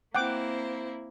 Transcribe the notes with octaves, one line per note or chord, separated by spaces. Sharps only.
A#3 C4 E4 F#5 G5 D6